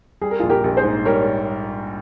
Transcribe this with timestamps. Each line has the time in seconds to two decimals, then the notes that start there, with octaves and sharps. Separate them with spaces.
0.22 G3 G#4
0.31 A#4
0.40 A#1 F4 G#4
0.50 G4 A#4
0.64 A#1
0.77 G#4 C5
0.84 G#2
1.05 G3 A#4 C#5